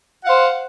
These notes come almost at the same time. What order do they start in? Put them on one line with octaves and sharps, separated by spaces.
F#5 F5 C5